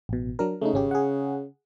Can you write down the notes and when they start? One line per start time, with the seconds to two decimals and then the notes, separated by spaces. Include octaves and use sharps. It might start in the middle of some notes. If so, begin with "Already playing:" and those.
0.09 A1 B2
0.39 F#3 D4 A#4
0.62 C#3 A3 D#4
0.74 G#1 C#4 G4
0.91 G#4 F#5